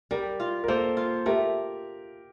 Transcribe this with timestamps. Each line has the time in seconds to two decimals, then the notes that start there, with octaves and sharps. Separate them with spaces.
0.11 G3 G4 A#4
0.40 F4
0.64 A#4
0.68 A#3 A4 C5
0.97 F4
1.26 A3 G4 A#4